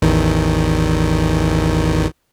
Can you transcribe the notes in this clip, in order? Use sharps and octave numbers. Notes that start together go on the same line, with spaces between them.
A1 E2 D#3